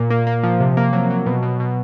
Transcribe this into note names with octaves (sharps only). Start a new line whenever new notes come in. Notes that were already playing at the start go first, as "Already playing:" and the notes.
Already playing: A#2
A#3
A#3
F3
C3
A#3
F#3
F#3
B2
B2
B2